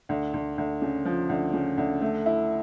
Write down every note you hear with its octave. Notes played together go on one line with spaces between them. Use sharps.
D2
D2
D2
C#3
F3
D2
C#3
D2
A3
E4